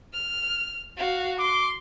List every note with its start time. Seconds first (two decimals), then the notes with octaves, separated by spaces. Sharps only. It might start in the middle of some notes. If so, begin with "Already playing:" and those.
0.13 F6
0.97 F#4 F5
1.40 C6 D6